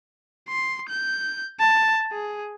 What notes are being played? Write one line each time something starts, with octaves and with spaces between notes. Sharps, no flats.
C6
G6
A5
G#4